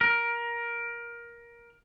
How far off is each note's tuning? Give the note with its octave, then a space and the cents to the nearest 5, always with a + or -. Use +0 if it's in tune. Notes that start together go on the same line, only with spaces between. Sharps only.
A#4 +15